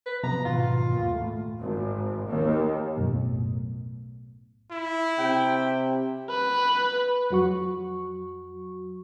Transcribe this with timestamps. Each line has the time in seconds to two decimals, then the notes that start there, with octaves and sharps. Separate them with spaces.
0.06 B4
0.24 C3 F3 B3 A#5
0.45 G#2 B2 D#3 F4
0.90 G1 D#2 A#2
1.12 A2 A3
1.60 G#1
2.28 D#2
2.97 B1 F#2 A2 A3
4.71 E4
5.18 C3 G5
6.30 B4
7.30 F2 F#3 F#4 C#6